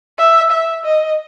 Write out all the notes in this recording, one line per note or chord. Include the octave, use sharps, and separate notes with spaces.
E5
E5
D#5